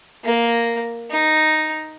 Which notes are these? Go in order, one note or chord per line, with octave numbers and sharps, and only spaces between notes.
A#3
D#4